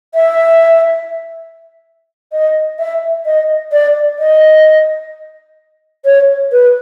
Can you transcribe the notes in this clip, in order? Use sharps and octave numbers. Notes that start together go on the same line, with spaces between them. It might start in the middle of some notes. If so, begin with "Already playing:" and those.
E5
D#5
E5
D#5
D5
D#5
C#5
B4